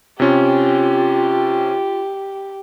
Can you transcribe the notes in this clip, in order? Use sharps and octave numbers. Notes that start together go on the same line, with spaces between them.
C3 C#4 F4 G4